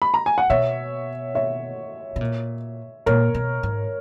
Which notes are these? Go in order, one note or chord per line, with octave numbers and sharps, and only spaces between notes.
B5
A#5
G#5
F#5
B2 C#5 E5
C#5 E5
B2
A#2
A#2 A#4 C#5
B2
G#2